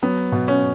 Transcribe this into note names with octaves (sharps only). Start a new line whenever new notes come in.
F#3 B3
B2
C#4